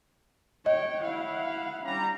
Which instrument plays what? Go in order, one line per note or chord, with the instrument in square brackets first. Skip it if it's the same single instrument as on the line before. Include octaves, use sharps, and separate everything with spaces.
[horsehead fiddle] C#5 G5 [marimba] D#5
[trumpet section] E4 [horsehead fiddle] F5 F#5
[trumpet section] G3 A#5 [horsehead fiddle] C#4 D4